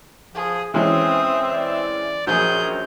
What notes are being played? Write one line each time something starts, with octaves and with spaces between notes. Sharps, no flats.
F3 G#4
E3 G#3 C4 C#4 E5 D#6
D5
A#1 F#2 G#4 A#4 G6